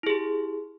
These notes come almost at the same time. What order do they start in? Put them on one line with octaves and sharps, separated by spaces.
E4 G#4 G4